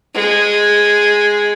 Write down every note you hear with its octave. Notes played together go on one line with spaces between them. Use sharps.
G#3